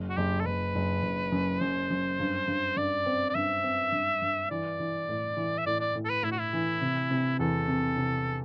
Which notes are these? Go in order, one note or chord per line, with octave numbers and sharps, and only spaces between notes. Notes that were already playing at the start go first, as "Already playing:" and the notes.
Already playing: F#1
F#4
F#1 G4
A4
F#1 B4
F#1
F#1
F#2
F#2 C5
F#2
G2
G2
G2 D5
C4
D5
G2 E5
C4
G2
G2
E3 D5
E3
A2
E3
E5
A2 D5
D5
A2
A4
B4
A2 E4
F#4
E4
E3
C3
C3
E2 A4
C3
C3